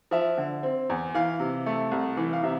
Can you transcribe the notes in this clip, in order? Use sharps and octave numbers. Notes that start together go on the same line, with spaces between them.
F3 E5
D3
C4
E2
E3 F5
C3
A3
C2
E3
F5
C3 E5